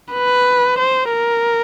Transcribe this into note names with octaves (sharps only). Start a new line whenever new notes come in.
B4
C5
A#4